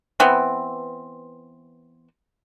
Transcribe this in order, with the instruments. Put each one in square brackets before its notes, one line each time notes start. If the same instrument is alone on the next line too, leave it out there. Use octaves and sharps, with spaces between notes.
[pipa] E3 B3 C4